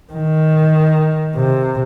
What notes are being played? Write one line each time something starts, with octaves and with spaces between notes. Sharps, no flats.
D#3
C3